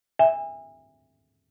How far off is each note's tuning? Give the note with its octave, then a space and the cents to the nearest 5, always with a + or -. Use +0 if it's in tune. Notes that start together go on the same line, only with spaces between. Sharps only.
E5 +0 G#5 -35